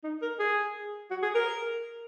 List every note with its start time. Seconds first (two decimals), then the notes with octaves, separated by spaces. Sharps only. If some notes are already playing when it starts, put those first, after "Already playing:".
0.04 D#4
0.22 A#4
0.40 G#4
1.11 F#4
1.23 G#4
1.35 A#4